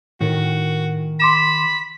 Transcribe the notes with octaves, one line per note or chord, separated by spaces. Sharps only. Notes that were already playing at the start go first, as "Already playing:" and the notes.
A2 D#3 F#4 A#4
B5 C6 D6 E7